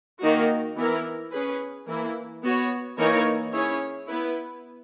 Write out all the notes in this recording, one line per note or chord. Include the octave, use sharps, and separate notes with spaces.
D#3 A#3 D#4 F#4
E3 B3 E4 A#4
C#4 G#4 B4
E3 A#3 E4
B3 F#4 C#5
E3 A#3 D#4 A#4 C#5
C#4 E4 G#4 C#5
B3 E4 B4